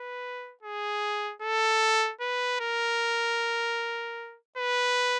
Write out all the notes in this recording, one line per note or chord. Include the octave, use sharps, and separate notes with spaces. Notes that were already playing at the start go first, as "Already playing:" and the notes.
Already playing: B4
G#4
A4
B4
A#4
B4